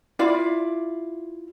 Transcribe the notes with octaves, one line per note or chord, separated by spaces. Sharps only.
E4 F4 D5 F5